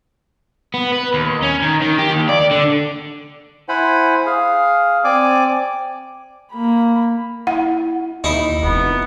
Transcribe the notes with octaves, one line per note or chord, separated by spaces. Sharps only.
B3
B4
D#2
C#4
D#3
D#3
G4
D#2
D5
D3
E4 C5 F#5 G#5 B5
G#4 F5
C4 D5 G#5 D6
A#3 B5
E4 F#5
D#2 D#4 E4
F1 B3